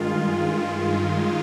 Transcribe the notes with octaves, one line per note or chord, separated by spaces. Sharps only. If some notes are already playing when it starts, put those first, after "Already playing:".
Already playing: G2 D#3 G#3 F4